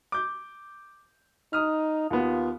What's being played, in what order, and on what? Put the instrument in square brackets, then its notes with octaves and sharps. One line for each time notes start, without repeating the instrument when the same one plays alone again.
[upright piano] D6 G6
[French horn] D#4 [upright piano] D#6 F6
[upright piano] D#2 B3 [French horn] F4